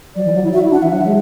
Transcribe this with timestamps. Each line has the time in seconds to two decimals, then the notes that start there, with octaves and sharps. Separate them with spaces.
0.16 F#3 D5
0.25 E3
0.35 F#3
0.44 E4
0.53 F#4 E5
0.64 E4
0.72 D4 F#5
0.83 E3 E5
0.91 F#3 F#5
1.01 E5
1.05 G#3